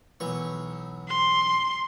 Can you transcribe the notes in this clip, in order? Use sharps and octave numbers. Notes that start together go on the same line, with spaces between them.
B1 E3 C#6
C6